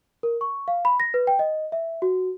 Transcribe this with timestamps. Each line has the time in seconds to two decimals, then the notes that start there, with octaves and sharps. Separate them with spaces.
0.23 A#4
0.41 C#6
0.68 F5
0.85 B5
1.00 A#6
1.14 B4
1.27 G5
1.39 D#5
1.72 E5
2.02 F#4